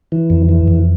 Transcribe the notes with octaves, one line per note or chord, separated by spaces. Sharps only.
E3
F2
E3
F2